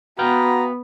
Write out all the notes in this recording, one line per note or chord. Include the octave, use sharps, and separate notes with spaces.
B3 F#4 B4 F5 G5 A#5